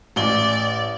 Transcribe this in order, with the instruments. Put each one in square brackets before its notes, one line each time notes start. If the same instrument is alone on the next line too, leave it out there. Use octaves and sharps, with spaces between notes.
[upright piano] A1 G7 [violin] D5